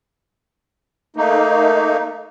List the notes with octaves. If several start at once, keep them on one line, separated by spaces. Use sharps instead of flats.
A3 A#3 D#4